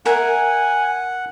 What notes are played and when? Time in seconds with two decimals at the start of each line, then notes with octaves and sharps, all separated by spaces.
0.06 A#4 E5 F#5 G#5